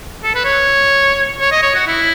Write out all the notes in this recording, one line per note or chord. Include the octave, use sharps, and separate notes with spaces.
A4
B4
C#5
C#5
D#5
C#5
F#4
E4